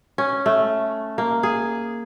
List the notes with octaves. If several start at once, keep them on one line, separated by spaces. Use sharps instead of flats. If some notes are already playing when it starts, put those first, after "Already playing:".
C#4
A3
A#3
G#4